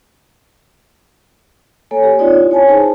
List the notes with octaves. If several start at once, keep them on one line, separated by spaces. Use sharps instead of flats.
A#3 A4 C#5 G#5
G4
C4 D#4 F4 C#5 D5
E4
C#5 G#5 A5
D#4 G#4 C5 A5